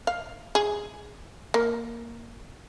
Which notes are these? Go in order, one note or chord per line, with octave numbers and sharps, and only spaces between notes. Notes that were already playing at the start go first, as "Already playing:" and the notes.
F5
G#4
A#3